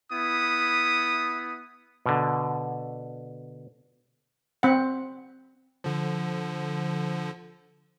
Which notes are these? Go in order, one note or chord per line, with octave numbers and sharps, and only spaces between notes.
B3 E4 D#6
B2 D3
C4 F#5
D3 F3